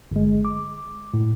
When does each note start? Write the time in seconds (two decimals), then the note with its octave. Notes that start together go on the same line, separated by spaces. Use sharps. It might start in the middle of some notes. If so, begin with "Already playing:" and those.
0.11 G1 G#3
0.45 D6
1.14 A2